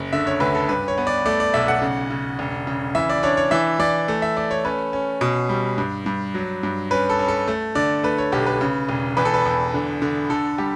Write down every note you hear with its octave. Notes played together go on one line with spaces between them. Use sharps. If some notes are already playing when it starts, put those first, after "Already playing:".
Already playing: F#1
D3 E5
C#5
D2 B4
A4
G2 B4
C#5
B3
D5
A3 D5
D5
B1 E5
F#5
C#3
C#3
E1
C#3
E3 E5
D5
D4 C#5
C#5
E3 E5
E3 D5
A3
E5
A3 D5
C#5
C#4 B4
C#4
B2
G3
G2
G2
F#3
G2
C#4 B4
A4
C#4
A4
A3
D3 D5
A3 B4
C#5
B1 G4
B4
C#3
E1
E2 B4
A4
B4
E2
D3
D3
D3 A4
G3 G4